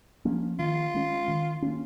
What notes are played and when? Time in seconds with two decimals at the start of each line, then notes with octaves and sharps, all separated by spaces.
0.25 F3 A#3 C#4
0.59 D#3 F4
0.94 G#3 C#4
1.28 D#3
1.62 A#3 C#4